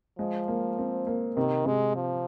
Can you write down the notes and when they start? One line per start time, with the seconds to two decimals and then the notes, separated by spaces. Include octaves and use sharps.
0.19 F3 G#3
0.48 A#3
0.79 C4
1.07 A#3
1.36 C3 D#3
1.66 C3 G#3
1.96 F3